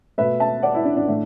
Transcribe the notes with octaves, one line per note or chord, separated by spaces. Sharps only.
B2 A3 B4 E5
E5 A5
D5 F#5
E4
D4
D4
A2 A3